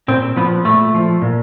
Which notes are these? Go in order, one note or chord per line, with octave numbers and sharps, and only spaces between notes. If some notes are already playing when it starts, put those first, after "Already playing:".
A#2 C4
F3 B3
A#2 A3
F3
A#2